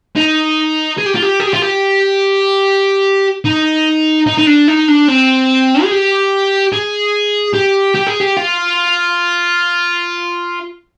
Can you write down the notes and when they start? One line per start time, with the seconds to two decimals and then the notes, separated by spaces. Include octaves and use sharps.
0.16 D#4
0.98 G#4
1.06 G4
1.15 F4
1.22 G4
1.40 G#4
1.47 G4
1.54 F4
1.62 G4
3.45 D#4
4.27 D#4
4.38 D#4
4.47 D4
4.68 D#4
4.88 D4
5.08 C4
5.83 G#4
5.91 G4
6.73 G#4
7.54 G4
7.95 G4
8.07 G#4
8.20 G4
8.37 F4